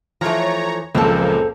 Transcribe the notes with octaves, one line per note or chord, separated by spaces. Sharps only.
E3 F3 A3 C#5 A#5
C#2 F#2 A#2 F3 A#3 C4 A4